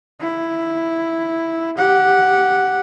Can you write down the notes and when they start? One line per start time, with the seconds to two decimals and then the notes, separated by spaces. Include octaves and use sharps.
0.21 E4
1.78 G4 F#5